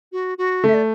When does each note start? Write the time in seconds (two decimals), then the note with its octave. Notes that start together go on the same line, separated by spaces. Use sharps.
0.12 F#4
0.38 F#4
0.64 A3 E5
0.74 D5